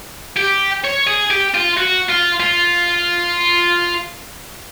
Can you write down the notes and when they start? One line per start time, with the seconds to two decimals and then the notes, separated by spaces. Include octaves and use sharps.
0.37 G4
0.84 C#5
1.07 G#4
1.31 G4
1.55 F4
1.77 F#4
2.09 F4
2.40 F4